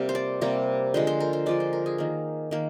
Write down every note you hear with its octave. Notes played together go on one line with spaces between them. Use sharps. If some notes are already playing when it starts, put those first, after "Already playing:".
Already playing: C3 G3 A#3
C5
D5
C3 G3 A#3
D3 F3 G#3 C5
C5
A#4
C5
D3 F3 G#3 D5
C5
A#4
G#4
D#3 A#3
D#3 A#3